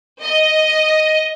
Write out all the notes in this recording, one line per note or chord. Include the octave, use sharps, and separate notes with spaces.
D#5